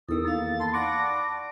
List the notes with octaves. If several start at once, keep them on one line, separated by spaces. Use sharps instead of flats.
E2 D#3 A4 D#6 E6
A#3 F5 A6
A5 B5 C6
D5 F#5 C#6 D6 A#6